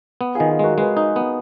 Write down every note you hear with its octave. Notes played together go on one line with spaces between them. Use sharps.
B3
D#3 F4 G#4
F4 G#4
G#3 F#4 A#4
G#3 G#4 B4
D#4
B3